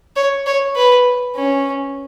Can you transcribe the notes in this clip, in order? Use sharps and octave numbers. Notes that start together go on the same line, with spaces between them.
C#5
C#5
B4
C#4